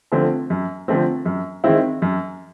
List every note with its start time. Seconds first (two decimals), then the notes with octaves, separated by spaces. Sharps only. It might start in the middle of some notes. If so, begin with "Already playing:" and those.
0.12 D3 F3 A3 C4
0.50 F#2
0.88 D3 F3 A3 C4
1.26 F#2
1.64 D#3 G#3 C4 E4
2.02 F#2